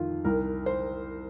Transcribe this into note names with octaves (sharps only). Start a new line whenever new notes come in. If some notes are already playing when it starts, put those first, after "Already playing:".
Already playing: F2 D#3 F4
C2 A#4
C5